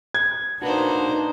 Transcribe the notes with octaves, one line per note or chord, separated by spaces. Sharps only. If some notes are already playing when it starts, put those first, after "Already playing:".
G#6
A#3 D4 D#4 F#4 B4 C5